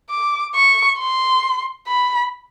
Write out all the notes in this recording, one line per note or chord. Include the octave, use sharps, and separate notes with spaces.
D6
C#6
C6
B5